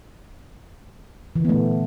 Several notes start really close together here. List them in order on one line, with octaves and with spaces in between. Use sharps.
E3 D3 B3 A3 A#2